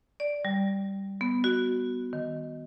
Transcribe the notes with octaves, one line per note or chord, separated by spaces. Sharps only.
D5
G3
B3
F#4
D#3